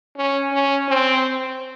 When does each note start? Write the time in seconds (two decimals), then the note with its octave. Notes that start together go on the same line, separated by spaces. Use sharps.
0.17 C#4
0.52 C#4
0.88 C4